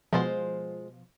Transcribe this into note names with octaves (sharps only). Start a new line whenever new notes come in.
B2 F3 G#3 F4 C5